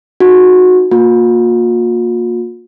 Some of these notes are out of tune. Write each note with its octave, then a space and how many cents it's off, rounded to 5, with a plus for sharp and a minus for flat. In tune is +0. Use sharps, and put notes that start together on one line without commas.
D#4 +0 F#4 -20
A#3 +0 F4 +45